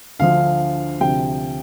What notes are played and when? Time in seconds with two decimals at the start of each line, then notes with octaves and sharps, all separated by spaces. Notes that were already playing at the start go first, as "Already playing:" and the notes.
0.20 D2 D3 F3 F5
1.00 D2 C3 F3 G5